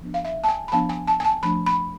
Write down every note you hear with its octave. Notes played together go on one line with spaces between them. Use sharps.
F3 B3 D4
F5
E5
A5
G#5
B5
F3 B3 D4 A5
G#5
A5
G#5
A5
F3 A3 D4 B5
B5